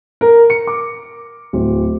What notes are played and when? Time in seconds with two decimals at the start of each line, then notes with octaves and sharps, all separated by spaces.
0.21 A#4
0.50 C#7
0.67 D6
1.53 D1